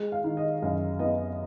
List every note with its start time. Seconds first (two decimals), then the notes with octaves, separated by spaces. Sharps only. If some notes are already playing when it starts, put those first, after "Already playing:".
Already playing: G#3
0.12 F5
0.24 D#3
0.37 D#5
0.62 F#2 F5
0.99 B3 D#5